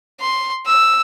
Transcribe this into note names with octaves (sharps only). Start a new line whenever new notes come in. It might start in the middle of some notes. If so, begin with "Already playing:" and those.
C6
E6